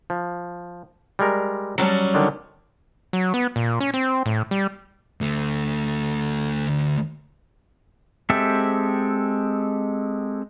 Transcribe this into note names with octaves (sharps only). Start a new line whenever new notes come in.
F3
G3 G#3 A#4
F#3 G3 C#4 A5 A#5
D3 D#3 D4
F#3
B3
A#2
C#4
C4
A2
G3
D2 A3
G#3 C4 G4 A4 E5